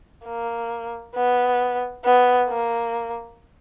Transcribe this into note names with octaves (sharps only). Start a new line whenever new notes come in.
A#3
B3
B3
A#3